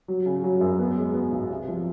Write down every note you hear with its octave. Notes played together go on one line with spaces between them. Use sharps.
F#3
C#3
F#3
F#2
B3
G#3
B3
B1
C3
F3